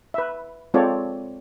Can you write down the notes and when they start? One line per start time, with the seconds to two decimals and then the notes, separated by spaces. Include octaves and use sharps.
0.14 B4 E5
0.74 G#3 C4 F4 A4 C#5 D5